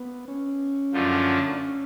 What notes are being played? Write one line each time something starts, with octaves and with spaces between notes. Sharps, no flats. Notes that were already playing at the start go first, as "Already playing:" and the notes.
Already playing: B3
C#4
F#2 D3 F3 A3 F4
D4
C#4